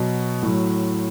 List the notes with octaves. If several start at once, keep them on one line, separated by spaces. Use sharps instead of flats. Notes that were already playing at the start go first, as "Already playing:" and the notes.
Already playing: B2 F#3
A2 F#3